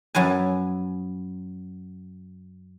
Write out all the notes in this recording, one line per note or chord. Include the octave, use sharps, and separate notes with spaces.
F#2 F#3 B4 G#5